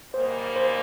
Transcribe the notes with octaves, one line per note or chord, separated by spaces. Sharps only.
G#2 G3 A#3 C5
C5